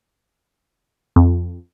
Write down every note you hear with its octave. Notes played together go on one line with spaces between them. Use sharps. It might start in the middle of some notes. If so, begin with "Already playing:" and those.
F2